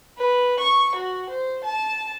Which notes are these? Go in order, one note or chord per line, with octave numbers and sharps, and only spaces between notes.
B4
C#6
F#4
C5
A5